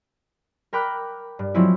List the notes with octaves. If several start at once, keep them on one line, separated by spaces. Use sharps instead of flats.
A#4 G5 B5 D6 F#6
G2
F3 F#3 G#3 C4 E4